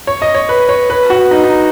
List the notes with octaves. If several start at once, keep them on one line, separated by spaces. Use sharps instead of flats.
C#5
D#5
C#5
B4
C#5
B4
F#4
D#4
D#4